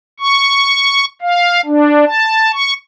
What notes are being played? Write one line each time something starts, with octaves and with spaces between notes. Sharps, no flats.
C#6
F5
D4
A5
C#6